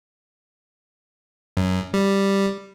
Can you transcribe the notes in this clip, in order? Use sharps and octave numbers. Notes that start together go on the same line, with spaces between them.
F#2
G3